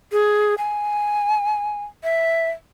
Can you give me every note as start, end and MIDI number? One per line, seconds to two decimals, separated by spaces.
0.12 0.55 68
0.58 1.84 80
2.03 2.50 76